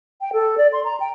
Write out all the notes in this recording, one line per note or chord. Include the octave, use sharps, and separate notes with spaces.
G5
A4
D5
C6
A#5
G5